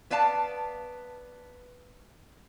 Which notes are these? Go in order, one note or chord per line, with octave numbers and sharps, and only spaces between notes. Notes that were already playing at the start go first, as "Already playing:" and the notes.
B3 B4 D5 F5 A5